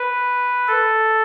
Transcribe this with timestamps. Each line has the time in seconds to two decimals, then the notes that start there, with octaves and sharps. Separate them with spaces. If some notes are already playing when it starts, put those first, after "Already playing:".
Already playing: B4
0.68 A4